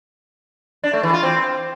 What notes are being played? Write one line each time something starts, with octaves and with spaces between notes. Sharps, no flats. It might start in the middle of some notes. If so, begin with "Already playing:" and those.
D4
A3
E3
F4
C4